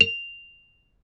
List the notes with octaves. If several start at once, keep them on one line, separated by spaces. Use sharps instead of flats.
F7